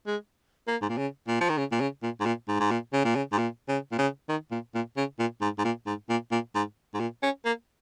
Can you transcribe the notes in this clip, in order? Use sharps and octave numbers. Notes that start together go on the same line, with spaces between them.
G#3
A#3
G#2
A#2
C#3
A#2
F3
D#3
C#3
A#2
C#3
A#2
G#2
A#2
G#2
G#2
A#2
C#3
A#2
C#3
G#2
A#2
C#3
A#2
C#3
D#3
A#2
A#2
C#3
A#2
G#2
G#2
A#2
G#2
A#2
A#2
G#2
G#2
A#2
C#4
A#3